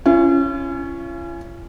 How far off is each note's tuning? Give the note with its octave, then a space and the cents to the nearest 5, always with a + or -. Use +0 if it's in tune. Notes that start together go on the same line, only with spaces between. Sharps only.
C#4 +0 F4 -45